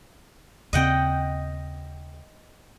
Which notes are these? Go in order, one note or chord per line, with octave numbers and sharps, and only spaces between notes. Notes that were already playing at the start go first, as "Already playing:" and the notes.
D#2 C#3 C4 D#5 F#5 G5